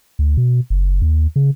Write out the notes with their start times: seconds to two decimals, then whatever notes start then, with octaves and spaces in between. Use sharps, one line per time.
0.19 D2
0.37 B2
0.70 F#1
1.02 D#2
1.36 C#3